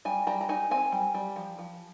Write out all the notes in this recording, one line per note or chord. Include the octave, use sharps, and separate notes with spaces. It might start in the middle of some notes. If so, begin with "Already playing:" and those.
G3 G#5
G3 A#5
A#5
D#4 G#5
C4 G#5
G3
G3
F3
F3